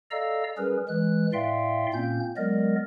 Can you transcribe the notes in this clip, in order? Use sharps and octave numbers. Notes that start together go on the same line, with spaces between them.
A4 D5 D#5 F5 A#5 E6
G3 C#4 G#4 A#4 B4
E3 G#3 F#6
A2 D5 E5 F5 G5 C6
A#2 A#3 C4 C#4 G6
F#3 G#3 B3 A#4 D5 D#5